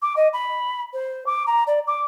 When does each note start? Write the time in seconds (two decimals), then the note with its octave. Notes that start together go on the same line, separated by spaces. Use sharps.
0.02 D6
0.16 D#5
0.33 B5
0.93 C5
1.26 D6
1.46 A#5
1.67 D5
1.87 D6